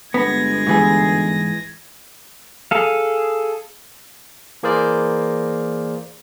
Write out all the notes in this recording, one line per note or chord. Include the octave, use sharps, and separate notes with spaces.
G1 G#3 B3 G#6 A#6
G#2 E3 G#4
G#4 A4 F5
E3 A#3 G#4 A#4 C5 D5